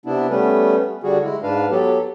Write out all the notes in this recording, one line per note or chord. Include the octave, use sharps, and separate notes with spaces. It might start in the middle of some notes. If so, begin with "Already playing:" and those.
C3 B3 D4 E4
G3 A3 B3 C#4 B4
D3 G3 F#4 G#4
G#3 E4
G#2 D4 B4 F5
F#3 B3 G4 A4